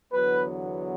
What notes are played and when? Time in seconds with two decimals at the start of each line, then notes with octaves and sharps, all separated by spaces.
0.12 E2 D3 F#3 B3 B4